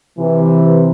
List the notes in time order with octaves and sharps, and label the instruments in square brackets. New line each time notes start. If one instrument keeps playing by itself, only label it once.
[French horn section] C3 E3